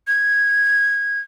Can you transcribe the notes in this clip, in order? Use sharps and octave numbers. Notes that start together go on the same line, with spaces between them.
G#6